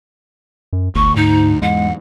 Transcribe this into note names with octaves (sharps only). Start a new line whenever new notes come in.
F#2
G1 D2 C#6
G#2 D#4
E2 G#2 G#3 F#5